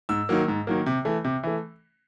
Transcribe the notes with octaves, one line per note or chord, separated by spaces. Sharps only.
G#2 E6
D#3 F#3 A#3
G#2
D#3 F#3 A#3
C3
E3 A3
C3
E3 A3